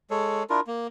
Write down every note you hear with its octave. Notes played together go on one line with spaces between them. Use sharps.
G#3 A4 C#5
D4 E4 F4 A#4
A#3